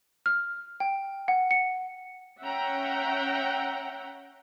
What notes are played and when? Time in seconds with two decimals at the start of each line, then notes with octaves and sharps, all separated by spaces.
0.26 F6
0.80 G5
1.28 F#5
1.51 C#7
2.41 C#4 E5 F#5 G5 A#5